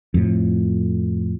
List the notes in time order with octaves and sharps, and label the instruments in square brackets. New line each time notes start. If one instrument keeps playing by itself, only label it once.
[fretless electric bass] F2 A2